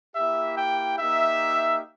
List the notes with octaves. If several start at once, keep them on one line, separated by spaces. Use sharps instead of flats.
A#3 E4 G4 E5
G5
A#3 D#4 G4 E5